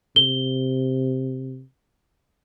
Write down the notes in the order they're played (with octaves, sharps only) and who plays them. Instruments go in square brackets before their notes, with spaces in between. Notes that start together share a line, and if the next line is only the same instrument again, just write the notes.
[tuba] C3 [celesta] G7